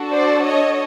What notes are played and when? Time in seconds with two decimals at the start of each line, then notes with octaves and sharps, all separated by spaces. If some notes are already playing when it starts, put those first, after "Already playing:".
Already playing: D4 F#4 A4
0.11 C5 D5
0.45 C#5 D#5